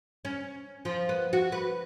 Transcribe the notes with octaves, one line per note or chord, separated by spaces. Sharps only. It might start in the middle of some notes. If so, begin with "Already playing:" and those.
C#4
F3
B3
F#4
B4